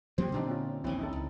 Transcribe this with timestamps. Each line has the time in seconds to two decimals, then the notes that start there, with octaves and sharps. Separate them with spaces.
0.18 F3 A#3 C#4 G4 C5
0.32 A#2 D3 C4 D4 D#4
0.47 C4 C#4 F4
0.84 A#1 D#2 E3 C4 C#4 E4
0.99 D#4 E4 A4
1.13 C#2